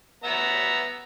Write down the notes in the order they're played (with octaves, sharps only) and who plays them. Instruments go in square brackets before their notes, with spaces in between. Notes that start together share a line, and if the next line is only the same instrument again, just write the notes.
[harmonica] B3 E5 A#5